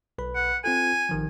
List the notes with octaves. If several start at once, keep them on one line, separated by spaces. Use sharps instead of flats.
B1 B4 B5
F#5
C4 F4 A4 G#5
A1 D#3 F3